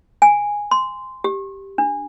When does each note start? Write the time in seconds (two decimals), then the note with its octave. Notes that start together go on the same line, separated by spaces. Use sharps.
0.22 G#5
0.71 C6
1.24 G4
1.78 D4